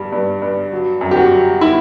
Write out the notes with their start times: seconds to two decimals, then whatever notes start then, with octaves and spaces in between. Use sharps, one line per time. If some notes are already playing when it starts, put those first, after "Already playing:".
Already playing: G2 G3
0.12 G2
0.42 G2
0.72 F#3
1.01 F#2
1.11 G4
1.17 F#4
1.30 F#3
1.61 E4